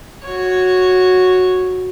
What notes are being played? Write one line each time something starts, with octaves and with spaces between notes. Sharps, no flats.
F#4 C#5